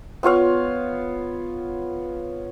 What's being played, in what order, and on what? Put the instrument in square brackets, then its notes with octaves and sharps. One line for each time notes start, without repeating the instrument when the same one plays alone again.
[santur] B3 F4 C#5 F5